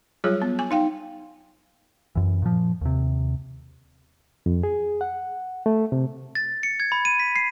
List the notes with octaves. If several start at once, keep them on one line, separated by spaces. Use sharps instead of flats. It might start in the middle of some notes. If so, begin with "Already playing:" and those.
F#3 G3 F4 G#4 C#5
B3
G#5
D#4 F5 G5
F#2 E3
A#2 F3
D#2 C3
F2
G#4
F#5
A3
C3
A6
C#7
G#6
B5
D#7
B6
C7